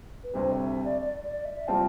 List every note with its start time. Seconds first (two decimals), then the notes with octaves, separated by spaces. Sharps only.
0.23 B4
0.34 D2 C3 G3 C5
0.51 E5
0.67 E5
0.84 D5
1.01 D5
1.23 D5
1.45 E5
1.67 C3 G3 C4 F4 A5